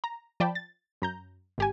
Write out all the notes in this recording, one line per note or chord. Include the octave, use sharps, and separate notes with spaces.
A#5
F3 D5 G5 A5 B5
A6
F#2 A#5 G6
G#1 G4 G#5